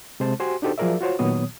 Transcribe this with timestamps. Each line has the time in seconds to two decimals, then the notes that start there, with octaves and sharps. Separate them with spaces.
0.20 C3 G#3 C5 A5
0.40 F#4 G4 C5 G#5 C6
0.62 D4 D#4 F#4 G4 A4 C5
0.78 F3 F#3 G#4 A#4 D5 E5
1.01 F4 F#4 C5 C#5
1.19 A#2 D#3 F#3 B3 C#5 D#6